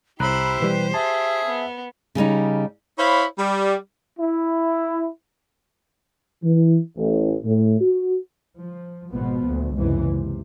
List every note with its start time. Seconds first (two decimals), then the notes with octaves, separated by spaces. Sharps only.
0.20 C2 E4 G4 C5 A#5 B5 F#6
0.60 B2 E3 G3 B4
0.94 G#4 E5 A5
1.45 B3
2.15 C#3 G3 C#4 D#4
2.98 E4 C5 C#5 F5 B5
3.38 G3
4.18 E4
6.43 E3
6.96 A1
7.44 A2
7.80 F#4
8.57 F3
9.11 G#1 B2 F3 B3
9.45 D2 A#2
9.77 F#1 C#2 G#2 C3 E3
10.11 C3